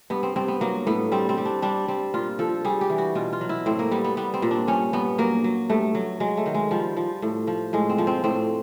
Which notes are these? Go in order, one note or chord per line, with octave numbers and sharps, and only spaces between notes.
G2 B3
C4
G2 C4
B3
F#3 A#3
A2 B3
G3 C4
C4
G3
D4
G3 D4
G3 C4
A#2 F4
F3 A4
G3 G#4
G4
E3
F#4
B2 F4
F4
F#3
E4
A2 C4
A#3
G3 B3
B3
G3 B3
C4
A#2
D4
G2 C#4
G2 B3
F#3 A#3
F#3
G2 A3
F#3
F#3 G#3
A3
D#3
G#3
F3 G3
F3
A2
F3
A2 G#3
C4
F3
C4
A2 C4